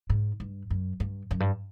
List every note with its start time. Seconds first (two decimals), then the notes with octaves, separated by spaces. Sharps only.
0.10 G#2
0.40 G2
0.70 F#2
1.00 G2
1.31 F#2
1.40 G2